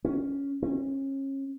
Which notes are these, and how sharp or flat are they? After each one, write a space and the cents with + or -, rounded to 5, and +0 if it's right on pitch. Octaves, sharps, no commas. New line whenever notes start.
C#4 +5
C#4 -30